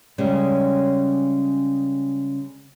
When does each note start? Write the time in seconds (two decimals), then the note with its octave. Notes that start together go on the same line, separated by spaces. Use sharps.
0.18 C#3 G3 G#3 C#4